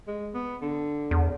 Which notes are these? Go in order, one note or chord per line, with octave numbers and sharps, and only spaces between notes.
G#3
B3
D3
E2